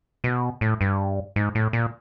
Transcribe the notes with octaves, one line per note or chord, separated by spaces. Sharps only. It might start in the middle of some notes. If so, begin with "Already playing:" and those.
B2
A2
G2
G#2
A2
A#2